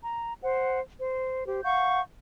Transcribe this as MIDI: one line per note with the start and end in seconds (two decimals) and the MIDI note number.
0.03 0.34 82
0.42 0.79 72
0.42 0.79 78
0.98 1.46 72
1.46 1.61 67
1.46 1.61 72
1.63 2.00 77
1.63 2.00 78
1.63 2.00 85
1.63 2.00 91